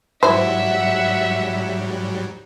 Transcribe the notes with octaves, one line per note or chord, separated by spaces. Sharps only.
G#2 F#3 G3 E4 C5 E5 F#5